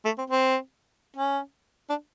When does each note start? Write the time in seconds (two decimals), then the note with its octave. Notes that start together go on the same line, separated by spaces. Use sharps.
0.05 A3
0.18 C4
0.30 C4
1.16 C#4
1.89 D4